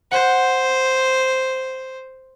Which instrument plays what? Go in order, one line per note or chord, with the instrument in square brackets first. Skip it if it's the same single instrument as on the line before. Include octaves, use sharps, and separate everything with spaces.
[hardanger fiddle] C5 [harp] F#5 G6